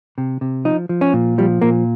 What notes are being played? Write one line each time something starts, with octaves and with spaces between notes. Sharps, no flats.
C3
C3
F3 D#4
F3
C#4
A#2
F3 G3
A#2 A#3